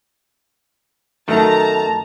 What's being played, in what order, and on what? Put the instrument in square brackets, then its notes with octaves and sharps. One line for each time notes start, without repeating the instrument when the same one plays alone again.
[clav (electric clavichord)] F#2 D#3 A3 [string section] A5 A#5